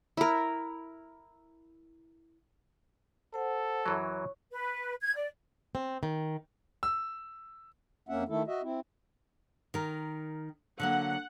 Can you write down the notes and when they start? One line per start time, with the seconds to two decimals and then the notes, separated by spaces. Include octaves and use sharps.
0.17 E4 A#4
3.34 A4 C5 F#5
3.86 F#2 E3 F#3 C#5 C#6
4.52 B4
5.02 G#6
5.16 D5
5.75 C4
6.03 D#3
6.83 E6
8.09 F2 A#3 C#4 E5 F#5
8.28 D#3 A3 E4 A4
8.47 F#4 D#5 E5
8.63 C4 E4
9.74 D#3 A#4
10.80 D3 F#3 A#3 F#5